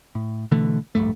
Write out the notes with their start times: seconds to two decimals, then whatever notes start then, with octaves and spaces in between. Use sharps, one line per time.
0.15 A2
0.51 B2 D3 E3 A3
0.95 D1 A#1 G2 A3